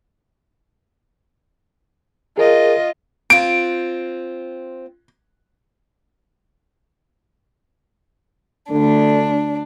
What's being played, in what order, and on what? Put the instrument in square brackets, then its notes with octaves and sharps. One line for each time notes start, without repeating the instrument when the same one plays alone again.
[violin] F4 D#5 [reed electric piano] G#4 A#4
[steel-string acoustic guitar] C4 F4 [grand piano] D7
[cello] D2 [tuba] D3 [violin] D4